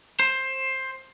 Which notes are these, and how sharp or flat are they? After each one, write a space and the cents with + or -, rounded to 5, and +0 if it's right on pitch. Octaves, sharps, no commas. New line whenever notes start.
C5 +15